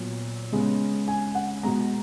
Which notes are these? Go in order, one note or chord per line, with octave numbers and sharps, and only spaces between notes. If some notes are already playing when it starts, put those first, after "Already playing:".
Already playing: A#2 F#3 B3
C#3 G#3 B3
G#5
F#5
B2 G#3 B3 A#5